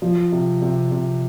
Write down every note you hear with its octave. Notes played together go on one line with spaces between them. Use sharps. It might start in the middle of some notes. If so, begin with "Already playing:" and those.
F3
C3
C3
C3